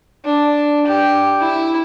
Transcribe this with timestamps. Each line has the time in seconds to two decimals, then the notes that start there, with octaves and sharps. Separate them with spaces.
0.25 D4
0.87 G4
1.40 E4